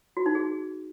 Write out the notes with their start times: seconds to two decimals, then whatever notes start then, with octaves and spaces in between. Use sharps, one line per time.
0.17 F#4
0.26 D#4
0.35 G#4